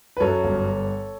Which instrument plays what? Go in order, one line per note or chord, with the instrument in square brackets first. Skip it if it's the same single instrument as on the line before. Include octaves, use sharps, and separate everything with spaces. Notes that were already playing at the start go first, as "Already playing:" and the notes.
[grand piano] B4
F#2 A4 C#5
G1